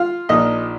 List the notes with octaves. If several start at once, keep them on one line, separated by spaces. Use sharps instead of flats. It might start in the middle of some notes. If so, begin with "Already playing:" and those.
Already playing: F4 F5
A#1 A#2 F3 D#4 D#5